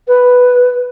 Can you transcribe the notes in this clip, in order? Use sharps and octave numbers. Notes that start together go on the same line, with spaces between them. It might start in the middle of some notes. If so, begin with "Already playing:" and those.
B4